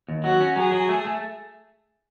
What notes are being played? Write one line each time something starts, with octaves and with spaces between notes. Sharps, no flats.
D#2
F#3 F#4
C#4
F#3 G#4
F#3
A3
A3